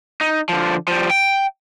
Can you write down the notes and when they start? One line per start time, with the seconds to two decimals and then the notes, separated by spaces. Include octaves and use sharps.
0.21 D#4
0.49 D3 F3
0.88 F3 G3
1.10 G5